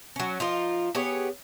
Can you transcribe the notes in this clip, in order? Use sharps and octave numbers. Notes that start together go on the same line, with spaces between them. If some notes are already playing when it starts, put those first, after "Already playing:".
F#3 C#4
F3 D#4 F4
B3 G4 G#4 C#5